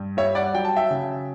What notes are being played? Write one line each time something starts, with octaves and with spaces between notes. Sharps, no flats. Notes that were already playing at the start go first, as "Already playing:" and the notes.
Already playing: G2
G3 C#5 E5
D5 F#5
F#3 G5
A5
E5 G5
C#3